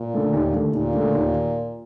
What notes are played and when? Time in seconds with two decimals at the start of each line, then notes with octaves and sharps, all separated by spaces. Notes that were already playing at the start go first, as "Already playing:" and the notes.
Already playing: A#2
0.14 D3 A3
0.33 D#2
0.53 D3 A3
0.73 D#2 A#2
0.94 D3 A3
1.14 D#2